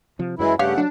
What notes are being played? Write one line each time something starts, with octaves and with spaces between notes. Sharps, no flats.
C3 F3
F#2 E3 F#3 G#3 E4
G2 C#3 A3 G4 C#5 F5 F#5
F#3 D4